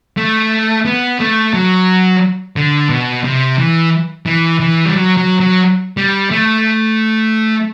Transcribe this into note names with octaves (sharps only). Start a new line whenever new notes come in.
A3
B3
A3
F#3
D3
B2
C3
E3
E3
E3
G3
F#3
F#3
F#3
G3
A3